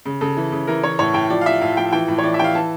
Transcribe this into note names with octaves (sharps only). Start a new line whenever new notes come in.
C#3
C#3 A4
E3
C#3
E3 A#4
E3 C#5
A2 C#5
A2 G5
F3 D5
F5
F3 E5
A2 F5
F3 G5
E3 G5
A2
C#5
E3 D5
E5
E3 G5
F5
E3 A5